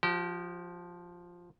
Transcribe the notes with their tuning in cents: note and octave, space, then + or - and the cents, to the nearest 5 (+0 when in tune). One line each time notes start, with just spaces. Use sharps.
F3 +5 G4 -35